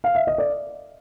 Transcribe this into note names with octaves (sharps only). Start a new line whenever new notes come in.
F5
E5
D#5
D5